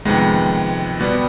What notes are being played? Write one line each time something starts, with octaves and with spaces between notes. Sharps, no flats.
F2 C3 D#3 G#3 B3
B2 G3 B3